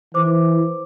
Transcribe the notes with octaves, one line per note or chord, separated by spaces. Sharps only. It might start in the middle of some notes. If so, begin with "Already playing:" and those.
E3 C5 D6